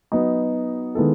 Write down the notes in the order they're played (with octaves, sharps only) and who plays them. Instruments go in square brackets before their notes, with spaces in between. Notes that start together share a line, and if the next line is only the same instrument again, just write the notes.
[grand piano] F#3 B3 D#4
D#3 G#3 B3 E4 A4